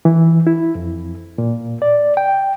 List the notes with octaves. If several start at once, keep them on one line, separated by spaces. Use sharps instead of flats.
E3
E4
F2
A#2
D5
G5